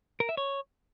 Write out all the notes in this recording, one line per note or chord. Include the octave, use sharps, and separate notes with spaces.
A#4
E5
C#5